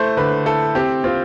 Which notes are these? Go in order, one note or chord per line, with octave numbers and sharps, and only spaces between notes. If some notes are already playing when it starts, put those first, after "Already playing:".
Already playing: A3 E4 C5
D3 B4
E4 A4
C4 G4
C4 F4